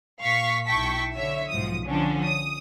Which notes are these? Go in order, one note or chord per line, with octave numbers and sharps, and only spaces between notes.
A#2 F5 C#6 B6
B1 E4 G5 A5 C#6 B6
D3 C#5 E5
B1 G#2 F3 D#6
D3 F3 C#4 D4
D#6